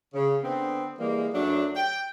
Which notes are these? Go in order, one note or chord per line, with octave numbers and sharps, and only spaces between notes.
C#3
D3 B3 C4
E3 G3 G#3 A#3
F#2 F#3 A3 D4
G5